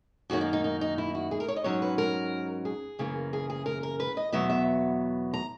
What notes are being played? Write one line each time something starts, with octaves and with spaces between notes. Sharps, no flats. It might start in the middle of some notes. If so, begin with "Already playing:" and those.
F#2 D#3 A#3 C#4 F#4
D#4
D#4
D#4
D#4
E4
F#4
G#4
A#4
C#5
D#5
G#2 F#3 C#4 C#5
B4
A#4
G#4
F#2 C#3 E3 A#3
G#4
G#4
A#4
A#4
B4
D#5
E2 B2 F#3 B3 E5
E5
A#5